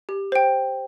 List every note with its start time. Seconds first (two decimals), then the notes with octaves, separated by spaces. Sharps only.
0.09 G4
0.32 C5 G5